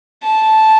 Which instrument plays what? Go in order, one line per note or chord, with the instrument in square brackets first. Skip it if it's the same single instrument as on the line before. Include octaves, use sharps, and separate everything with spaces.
[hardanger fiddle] A5